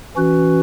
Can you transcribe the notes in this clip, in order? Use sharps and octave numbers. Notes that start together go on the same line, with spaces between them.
E3 C#4 F#4 B4